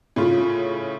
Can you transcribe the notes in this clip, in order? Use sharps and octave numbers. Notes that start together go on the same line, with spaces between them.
A2 C#3 F4